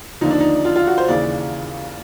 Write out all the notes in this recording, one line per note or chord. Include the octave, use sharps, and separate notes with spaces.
D#2 D3 F3 D#4
D4
D#4
F4
F4
F#4
C5
D#2 C#3 E3 D5